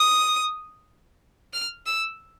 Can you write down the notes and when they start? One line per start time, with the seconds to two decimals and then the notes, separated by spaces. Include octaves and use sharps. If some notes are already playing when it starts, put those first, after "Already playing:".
Already playing: D#6
1.54 F6
1.86 E6